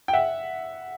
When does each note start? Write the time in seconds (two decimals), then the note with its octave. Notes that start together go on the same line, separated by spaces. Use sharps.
0.08 G5
0.13 E5 F#5